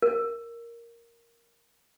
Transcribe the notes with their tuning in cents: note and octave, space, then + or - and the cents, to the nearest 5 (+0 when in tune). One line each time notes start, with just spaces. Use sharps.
A#4 +0